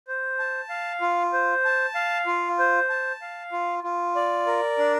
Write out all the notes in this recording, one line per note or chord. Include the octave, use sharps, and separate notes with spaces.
C5
A5
F5
F4
C5
A5
F5
F4
C5
A5
F5
F4
F4
D5
A#4
D4